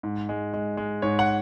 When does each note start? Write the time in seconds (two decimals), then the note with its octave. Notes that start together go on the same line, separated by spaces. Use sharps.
0.03 G#2
0.29 G#3
0.54 G#3
0.77 G#3
1.02 G#2 C#5
1.19 F#5